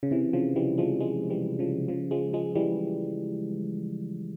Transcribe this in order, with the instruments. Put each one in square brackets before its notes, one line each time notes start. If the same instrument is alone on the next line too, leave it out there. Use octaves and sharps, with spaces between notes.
[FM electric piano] C#3
C3 E3
C#3 F3
E3 G3
F3 G#3
F3 G#3
E3 G3
C#3 F3
C#3 F3
F3 G#3
F3 G#3
E3 G3